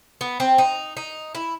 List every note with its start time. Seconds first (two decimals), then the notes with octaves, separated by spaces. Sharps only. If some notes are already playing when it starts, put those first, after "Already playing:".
0.21 B3
0.40 C4
0.58 D#4
0.97 D#4
1.35 E4